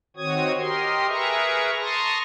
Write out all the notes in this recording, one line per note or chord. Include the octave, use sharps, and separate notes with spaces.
D#3 C4 F#4 C#5 D#6 G#6
G4 A#4 D#5 C6
G#4 A#4 B4 E5 A#5 C#6
A5 A#5 C6 C#6 D#6 A#6